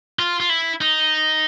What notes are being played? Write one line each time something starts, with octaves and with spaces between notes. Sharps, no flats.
F4
F4
E4
D#4